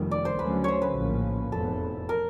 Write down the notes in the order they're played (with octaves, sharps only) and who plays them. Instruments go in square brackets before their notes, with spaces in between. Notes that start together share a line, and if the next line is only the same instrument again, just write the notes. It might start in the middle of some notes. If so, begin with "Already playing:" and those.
Already playing: [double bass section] F1 D#2 D#3 G3
[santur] D5
C5
[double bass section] D2 D3 F#3 A3 C#4 [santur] B4
[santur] C5 C#5
B4
[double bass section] A#1 A2 F3 A#3 C#4
[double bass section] F1 E2 B2 [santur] A4
[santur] A#4